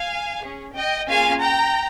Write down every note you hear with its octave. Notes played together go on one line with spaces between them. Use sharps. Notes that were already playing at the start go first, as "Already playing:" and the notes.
Already playing: F5 G#5
C#4 G#4
D#5 G5
A#3 C#4 F4 G#4 F5 G#5
G5 A#5